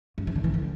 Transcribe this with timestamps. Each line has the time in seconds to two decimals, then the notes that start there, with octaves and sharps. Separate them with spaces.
0.18 F#2
0.27 E3
0.35 D3
0.44 E3
0.54 D3